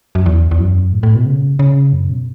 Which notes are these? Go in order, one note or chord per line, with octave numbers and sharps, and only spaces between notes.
F#2
E2
E2
F#2
A2
A2
B2
C#3
C#3
F#2
B2